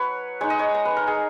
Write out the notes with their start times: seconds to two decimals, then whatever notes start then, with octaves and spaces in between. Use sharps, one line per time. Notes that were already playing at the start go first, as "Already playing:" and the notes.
Already playing: F#3 B4 C#5
0.41 G#3 D#4 C#5
0.50 D#5
0.59 C#5
0.74 A#5
0.85 B4
0.97 A#4
1.07 G#4